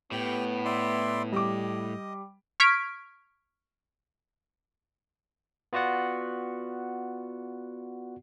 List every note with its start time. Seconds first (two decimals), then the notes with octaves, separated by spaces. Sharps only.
0.12 A2 B3 G4
0.65 E4 D5 C6
1.32 G3 D#5 D6
2.60 C#6 F6 G#6 B6 D7
5.73 B3 F4 F#4 D5 F#5